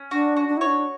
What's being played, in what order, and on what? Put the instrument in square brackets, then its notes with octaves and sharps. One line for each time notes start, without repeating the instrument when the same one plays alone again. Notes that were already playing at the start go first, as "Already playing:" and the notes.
Already playing: [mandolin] C#4
[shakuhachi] D4 [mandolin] F#4
[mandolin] F#4
[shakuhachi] D4
E4
[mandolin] C#5
[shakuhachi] D4